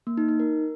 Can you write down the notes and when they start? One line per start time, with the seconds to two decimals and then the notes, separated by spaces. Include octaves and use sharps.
0.07 A#3
0.17 D#4
0.29 D#4
0.40 A#4